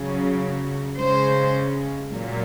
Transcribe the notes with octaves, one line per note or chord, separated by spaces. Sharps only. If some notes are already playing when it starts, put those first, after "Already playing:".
Already playing: C#3 F#3
C#3 G#3 C5
A#2 F#3